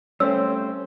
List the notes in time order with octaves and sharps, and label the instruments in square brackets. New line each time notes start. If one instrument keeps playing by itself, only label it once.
[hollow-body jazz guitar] G3 A3 C4 [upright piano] C#4 [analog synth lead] C5 [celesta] E6